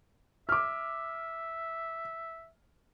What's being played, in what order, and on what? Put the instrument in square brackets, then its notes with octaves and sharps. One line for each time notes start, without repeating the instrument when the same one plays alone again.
[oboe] E5 [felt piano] D6 F6